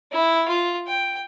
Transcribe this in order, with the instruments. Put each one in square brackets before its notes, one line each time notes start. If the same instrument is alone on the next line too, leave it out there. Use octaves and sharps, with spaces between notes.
[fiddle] E4
F4
G5